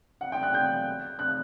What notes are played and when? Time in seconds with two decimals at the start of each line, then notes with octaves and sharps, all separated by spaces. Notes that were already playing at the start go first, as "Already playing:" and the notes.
0.21 F#5
0.32 G5
0.43 F#6
0.54 G6
1.19 F#6